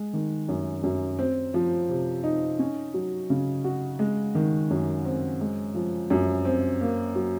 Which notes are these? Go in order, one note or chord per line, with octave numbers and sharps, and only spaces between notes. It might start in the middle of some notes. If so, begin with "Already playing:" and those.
Already playing: G#3
D#3
F#2
F#2
C4
F3
C3
D#4
C#4
F#3
C#3
F#4
G#3
D#3
F#2
C4
G#3
F3
F#2
C4
A#3
F#3